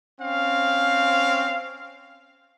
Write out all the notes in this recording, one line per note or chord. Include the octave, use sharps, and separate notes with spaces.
C4 C#4 F5